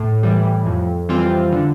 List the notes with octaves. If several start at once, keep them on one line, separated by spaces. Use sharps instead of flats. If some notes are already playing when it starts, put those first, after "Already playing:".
Already playing: A2
E3 G3
F2
E3 G3 C4 F4
D3